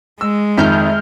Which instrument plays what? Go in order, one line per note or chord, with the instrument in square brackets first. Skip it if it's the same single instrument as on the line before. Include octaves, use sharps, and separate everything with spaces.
[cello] G#3 [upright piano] E6
[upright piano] F2 D#3 [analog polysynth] E5 F6 G6